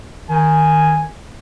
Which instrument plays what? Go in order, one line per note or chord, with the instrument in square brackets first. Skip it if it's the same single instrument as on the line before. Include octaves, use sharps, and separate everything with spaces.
[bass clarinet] D#3 [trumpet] G#5